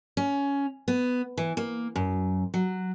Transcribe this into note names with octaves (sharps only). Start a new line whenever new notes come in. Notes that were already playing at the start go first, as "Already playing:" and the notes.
C#4
B3
E3
A#3
F#2
F#3